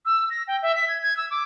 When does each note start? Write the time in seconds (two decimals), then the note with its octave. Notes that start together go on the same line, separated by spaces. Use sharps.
0.06 E6
0.30 A#6
0.48 G5
0.62 E5
0.76 B6
0.88 G#6
1.02 G#6
1.17 E6
1.31 D6